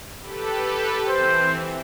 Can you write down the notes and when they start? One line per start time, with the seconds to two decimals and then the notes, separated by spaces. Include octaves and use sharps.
0.21 G4 A4 B4
1.09 E3 C4 C5